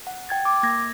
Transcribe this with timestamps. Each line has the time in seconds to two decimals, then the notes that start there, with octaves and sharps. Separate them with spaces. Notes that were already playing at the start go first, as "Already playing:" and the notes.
0.07 F#5
0.29 G5 G#6 A6
0.45 D6
0.63 A#3 G#6 A#6